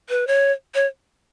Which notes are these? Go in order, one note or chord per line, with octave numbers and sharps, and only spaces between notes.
B4
C#5
C#5